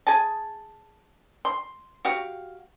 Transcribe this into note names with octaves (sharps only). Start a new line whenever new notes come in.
G#4 G#5 A5
C6
F#4 G4 F5